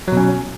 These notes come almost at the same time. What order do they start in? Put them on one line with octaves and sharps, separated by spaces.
F#3 B2 C#4